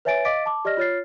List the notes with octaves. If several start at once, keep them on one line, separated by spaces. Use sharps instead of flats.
B4 C#5 E5 G#5 A6 D7
D#5 F5 D6 A6 B6 D7
A5 D6
G4 D5 D#5 F6 A#6
F4 C#5 F6 A6 C7